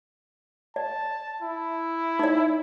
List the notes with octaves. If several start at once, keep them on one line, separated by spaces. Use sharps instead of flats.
D5 A5
E4
D#4 D5